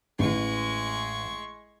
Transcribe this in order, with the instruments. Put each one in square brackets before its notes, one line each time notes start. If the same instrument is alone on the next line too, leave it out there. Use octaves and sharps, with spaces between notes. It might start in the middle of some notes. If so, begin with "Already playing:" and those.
[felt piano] A1 [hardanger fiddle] G#3 C#6